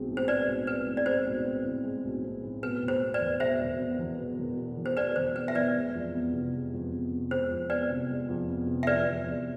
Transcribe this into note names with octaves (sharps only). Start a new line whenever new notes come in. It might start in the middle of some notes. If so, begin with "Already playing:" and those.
Already playing: B1 G#3 C4
A2
C5
G#3 B4 D5
B1
C4 B4
A2
D5
G#3 C5
B1
C4
A2
G#3
B1
C4
A2
B2 B4
E1
C5
B3
B4 D5
E2
B2 C5 E5
E1
B3
E2
B2
E1
B3
E2
C5
B2 B4 D5
E1 C5
B3 B4
E5
E2 B4 D5
G#3
F2
B3
C3
G#3
F2
B3
C3
G#3 C5
F2
B3 B4 D5
C3
G#3
F2
B3
C3
E5
F3 B4 D5
E2
E2